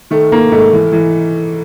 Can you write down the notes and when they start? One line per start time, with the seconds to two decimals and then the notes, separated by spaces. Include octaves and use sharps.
0.11 D#3 A3
0.32 D#3 A#3
0.52 G#2 A3
0.73 E3
0.92 E3